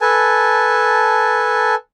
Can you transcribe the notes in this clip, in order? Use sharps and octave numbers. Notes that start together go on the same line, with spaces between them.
A4 B4 G#5 A5